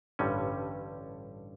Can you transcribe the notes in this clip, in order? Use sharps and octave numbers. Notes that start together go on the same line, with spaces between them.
A1 G2 D3 G3 C#4